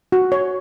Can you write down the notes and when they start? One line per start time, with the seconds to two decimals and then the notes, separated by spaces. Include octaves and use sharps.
0.12 F#4
0.32 C#5